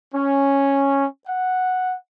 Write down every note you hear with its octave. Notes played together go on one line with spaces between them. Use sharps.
C#4
F#5